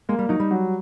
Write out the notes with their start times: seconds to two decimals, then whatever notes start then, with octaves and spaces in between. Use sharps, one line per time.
0.09 G#3 A#3
0.19 G3
0.29 F#3 D#4
0.40 G3
0.51 F#3